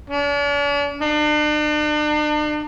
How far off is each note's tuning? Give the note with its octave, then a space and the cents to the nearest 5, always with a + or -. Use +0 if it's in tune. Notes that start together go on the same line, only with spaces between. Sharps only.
D4 -45
D4 +40